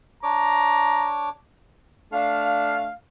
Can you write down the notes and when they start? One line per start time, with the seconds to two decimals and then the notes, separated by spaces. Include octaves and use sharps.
0.23 D4 C#5 A#5 D6
2.13 A3 D4 F5